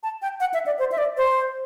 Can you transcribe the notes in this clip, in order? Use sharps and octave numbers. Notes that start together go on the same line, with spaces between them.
A5
G5
F#5
E5
D5
C5
E5
D5
C5